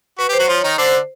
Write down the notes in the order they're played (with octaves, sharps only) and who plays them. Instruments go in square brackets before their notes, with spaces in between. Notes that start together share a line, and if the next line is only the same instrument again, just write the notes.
[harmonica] F#4 [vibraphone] B4
[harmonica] G4 [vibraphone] C5
[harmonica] F#3 F#4
[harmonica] F3 F4 [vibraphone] C#5
[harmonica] D#3 D#4
[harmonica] D3 D4 [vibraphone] C5